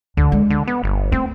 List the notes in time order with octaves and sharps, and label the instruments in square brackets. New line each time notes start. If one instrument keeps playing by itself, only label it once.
[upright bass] D2 [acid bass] D3
[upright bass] G#3
[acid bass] D3
B3
G1
[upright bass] A3 [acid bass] C4